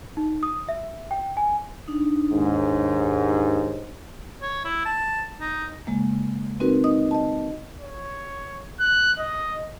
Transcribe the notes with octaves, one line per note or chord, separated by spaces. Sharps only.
D#4
D#6
E5
G5
G#5
D4 D#4
D#2 G#2
C#5
E4
A5
D#4
C#3 G#3 A#3
C4 D#4 F#4 A#4 B4
D#4 D#5 D#6
D#5 A5
C#5
F#6
D#5